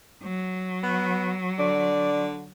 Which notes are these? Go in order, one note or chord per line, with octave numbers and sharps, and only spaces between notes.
F#3
B3
D3 D5